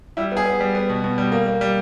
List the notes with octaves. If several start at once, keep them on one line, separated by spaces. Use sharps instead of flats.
G3 E4
B3 G#4
B3
G3
B3
B2
B2
G3
A#3
A#3
G3